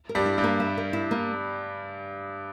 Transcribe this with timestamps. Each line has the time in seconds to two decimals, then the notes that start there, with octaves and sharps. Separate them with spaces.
0.09 A#4
0.15 G2 G3
0.26 E4
0.38 G2 G3
0.44 A#3
0.60 E5
0.77 A#4
0.93 E4
1.11 A#3